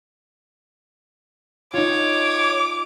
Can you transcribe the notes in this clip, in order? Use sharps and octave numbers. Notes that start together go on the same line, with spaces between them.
D#4 F4 C#5 D6